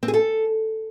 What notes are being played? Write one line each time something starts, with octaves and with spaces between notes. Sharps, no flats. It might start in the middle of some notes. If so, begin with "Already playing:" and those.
C4
G#4
A4